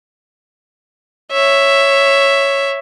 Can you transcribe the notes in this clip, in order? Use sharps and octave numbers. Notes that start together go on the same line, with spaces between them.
C#5 E5